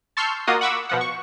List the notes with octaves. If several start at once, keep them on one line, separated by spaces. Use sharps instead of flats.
A5 C6 C#6 E6 F6 G6
A#3 F4 F#4 D#5 D#6
F#5 B5 C#6 D6 E6
B2 F3 F#5
C#6